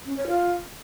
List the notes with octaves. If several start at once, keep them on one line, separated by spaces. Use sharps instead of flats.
C#4
C#5
F4